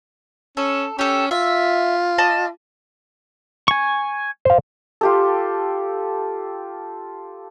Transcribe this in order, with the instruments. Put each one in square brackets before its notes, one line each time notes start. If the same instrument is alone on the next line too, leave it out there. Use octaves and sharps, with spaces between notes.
[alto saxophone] C#4 [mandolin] A4
[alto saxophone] C#4 [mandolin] G4 A4
[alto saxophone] F4 [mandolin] E5
[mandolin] D5 D#5 A5
[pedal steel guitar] G#5 C#6
[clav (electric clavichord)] C5 F5
[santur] F4 G4 A4